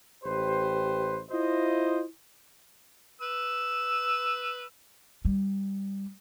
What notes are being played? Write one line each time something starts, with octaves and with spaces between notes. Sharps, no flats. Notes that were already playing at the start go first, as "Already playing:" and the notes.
A1 G4 B4 C5
E4 F4 C5 D#5
B4 E6
G3